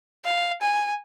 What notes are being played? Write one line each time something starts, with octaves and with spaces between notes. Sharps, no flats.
F5
G#5